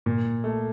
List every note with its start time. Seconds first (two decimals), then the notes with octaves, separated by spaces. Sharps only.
0.06 A#2
0.44 A3